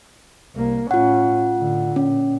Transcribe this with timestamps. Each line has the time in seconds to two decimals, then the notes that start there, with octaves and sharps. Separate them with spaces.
0.55 C2 A#3
0.91 A2 C#4 F4 F#5
1.57 A2 D3
1.96 A#2 C#4